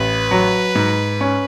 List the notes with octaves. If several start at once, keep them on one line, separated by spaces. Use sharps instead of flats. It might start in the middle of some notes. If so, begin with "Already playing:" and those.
Already playing: A1 B4
F#3
G#2
C#4